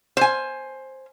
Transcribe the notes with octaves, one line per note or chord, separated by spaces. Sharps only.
C5 G#5